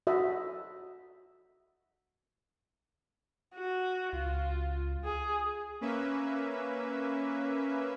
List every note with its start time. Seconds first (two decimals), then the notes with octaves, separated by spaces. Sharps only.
0.07 F#4 D#5 E5
3.54 F#4
4.13 C#2 F4
5.04 G#4
5.81 A#3 C#4 B4 E5